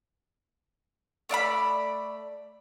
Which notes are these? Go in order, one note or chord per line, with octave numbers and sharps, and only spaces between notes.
A3 D5 F5 B5